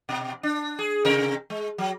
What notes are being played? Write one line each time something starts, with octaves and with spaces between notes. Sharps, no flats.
B2
D4
G#4
C3 A#4
G#3
F#3